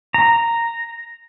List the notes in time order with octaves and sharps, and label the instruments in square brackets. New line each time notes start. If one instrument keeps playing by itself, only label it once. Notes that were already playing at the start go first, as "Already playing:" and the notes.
[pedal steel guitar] A#5